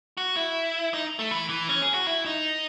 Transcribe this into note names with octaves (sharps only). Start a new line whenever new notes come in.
F#4
E4
D#4
A3
E3
E3
C#4
G#4
F#4
E4
D#4